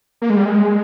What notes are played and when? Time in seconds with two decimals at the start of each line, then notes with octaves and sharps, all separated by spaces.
0.22 A#3
0.30 G#3
0.37 G3
0.45 G#3